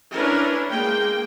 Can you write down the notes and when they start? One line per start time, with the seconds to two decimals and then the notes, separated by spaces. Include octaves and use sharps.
0.13 C#4 D4 E4 A#4 B4
0.71 G#3 A#3 G5